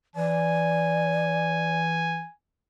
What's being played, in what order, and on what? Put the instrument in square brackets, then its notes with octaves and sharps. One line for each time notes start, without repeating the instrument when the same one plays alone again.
[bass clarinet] E3 [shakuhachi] D5 [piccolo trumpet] G#5